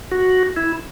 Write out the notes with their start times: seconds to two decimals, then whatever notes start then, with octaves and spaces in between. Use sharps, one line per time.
0.11 F#4
0.56 E4